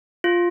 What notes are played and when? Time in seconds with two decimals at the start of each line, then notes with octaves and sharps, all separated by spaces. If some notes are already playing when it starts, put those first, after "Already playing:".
0.24 F4